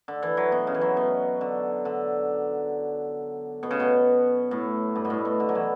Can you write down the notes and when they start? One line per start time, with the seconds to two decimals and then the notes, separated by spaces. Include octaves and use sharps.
0.08 D3
0.23 E3
0.37 F#3
0.52 B2
0.67 C#3
0.74 E3
0.81 F#3
0.97 B2
1.41 D3
1.85 D3
3.63 B2
3.71 C#3
3.80 B2
4.51 A2
4.95 G2
5.05 B2
5.10 A2
5.25 B2
5.40 D3
5.49 F#3
5.55 E3